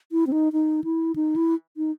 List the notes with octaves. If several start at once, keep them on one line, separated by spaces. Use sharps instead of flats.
E4
C4
D#4
D#4
E4
D#4
E4
D#4